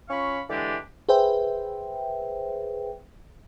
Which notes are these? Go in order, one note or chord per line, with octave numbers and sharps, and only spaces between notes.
C#4 F4 F5 B5 C#6
D3 E3 G#3 D4 G4 D5
G#4 B4 C5 E5 G5